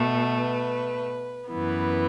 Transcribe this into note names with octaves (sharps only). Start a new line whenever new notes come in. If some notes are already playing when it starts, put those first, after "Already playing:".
Already playing: B2 A3
B4
F#2 E3 B3